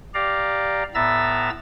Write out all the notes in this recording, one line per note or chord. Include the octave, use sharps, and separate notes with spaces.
G4 D5 F5 A#5
A2 B3 E5 A#5 E6 A6